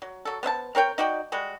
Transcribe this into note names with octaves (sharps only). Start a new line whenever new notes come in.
F#3
F#3 A4
B3 C5 E5 A5
C4 A#4 C#5 G5
D#4 F#4 D5 G5
G3 G#3 F#4